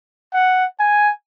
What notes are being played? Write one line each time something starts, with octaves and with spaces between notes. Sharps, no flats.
F#5
G#5